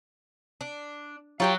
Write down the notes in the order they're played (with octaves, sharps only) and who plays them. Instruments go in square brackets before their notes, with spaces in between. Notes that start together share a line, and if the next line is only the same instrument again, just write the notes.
[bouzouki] D4
[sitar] F#3 [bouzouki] F4 G4 G5